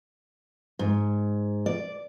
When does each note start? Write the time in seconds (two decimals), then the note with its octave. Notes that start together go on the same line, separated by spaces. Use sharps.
0.79 G#2
1.66 D5